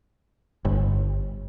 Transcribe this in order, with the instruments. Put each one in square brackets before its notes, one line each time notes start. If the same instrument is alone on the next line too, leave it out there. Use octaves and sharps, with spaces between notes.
[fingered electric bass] G1